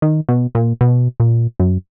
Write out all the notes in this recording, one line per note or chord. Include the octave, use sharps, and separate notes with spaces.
D#3
B2
A#2
B2
A#2
F#2